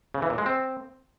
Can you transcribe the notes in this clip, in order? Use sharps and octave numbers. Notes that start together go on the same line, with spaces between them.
C#3
E3
A#2
G#3
C4